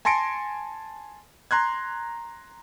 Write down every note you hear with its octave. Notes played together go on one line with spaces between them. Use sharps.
G#5 A5 C6 A#6 C#7 D7
A#5 C6 F#6 G#6